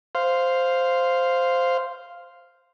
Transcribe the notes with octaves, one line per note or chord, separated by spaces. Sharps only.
C5 F5